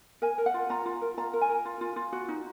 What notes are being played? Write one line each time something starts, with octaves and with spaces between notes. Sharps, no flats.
A#4 G#5
A#4
F#5
F4
F4 A#5
F4
A#4
F4 A#5
A#4
G#5
A#4
F4
F4
F4
F#4
D#4